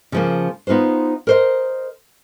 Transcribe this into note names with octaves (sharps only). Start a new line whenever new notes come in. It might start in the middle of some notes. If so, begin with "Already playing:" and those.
C#3 F3 A#3
B3 D#4 F4 B4 C5
A#4 C5 D#5